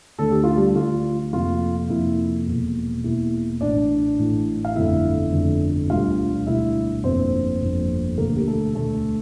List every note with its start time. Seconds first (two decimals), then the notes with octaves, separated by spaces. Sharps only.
0.18 D2 D3 A3 A4
0.31 G4
0.44 F4
0.57 G3 G4
0.75 D2 D3 A3 F4
1.33 F2 C3 F3 A#3 F4
1.90 F2 C3 F3 A#3 E4
2.47 E1 E2 E3 A#3
3.04 E1 E2 E3 A#3 E4
3.61 A1 A2 E3 D4 D5
4.18 A1 A2 E3
4.65 F5
4.75 G1 F2 D3 A3 E4 E5
5.32 G1 F2 D3 A3
5.90 E1 D2 D3 G3 F4 F5
6.46 E1 D2 D3 G3 E4 E5
7.04 G1 F2 D3 F3 A#3 C4 C5
7.62 G1 F2 D3 F3 A#3
8.18 E1 D2 D3 A#3 A#4
8.36 G4
8.47 A3 A4
8.75 E1 D2 D3 A3 A4